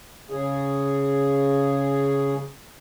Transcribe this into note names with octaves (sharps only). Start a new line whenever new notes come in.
C#3 G#4